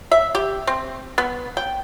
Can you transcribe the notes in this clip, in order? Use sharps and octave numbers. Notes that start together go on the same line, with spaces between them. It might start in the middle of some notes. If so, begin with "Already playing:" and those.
E5
G4
C4
B3
G5